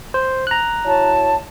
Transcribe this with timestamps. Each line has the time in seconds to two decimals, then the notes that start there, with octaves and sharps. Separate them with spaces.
0.14 C5
0.47 A#5 F#6
0.86 E4 F#4 C#5 A5